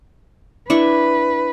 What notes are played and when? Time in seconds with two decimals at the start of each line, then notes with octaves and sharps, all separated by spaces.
0.70 D4 E4 B4 C#6